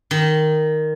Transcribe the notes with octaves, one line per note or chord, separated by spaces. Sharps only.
D#3